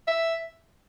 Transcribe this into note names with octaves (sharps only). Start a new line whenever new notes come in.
E5